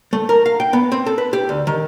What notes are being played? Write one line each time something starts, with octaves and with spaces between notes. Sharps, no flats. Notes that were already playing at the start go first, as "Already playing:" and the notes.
A3
A#4
F5
G5
B3
C4
A4
B4
G4
D2
D#3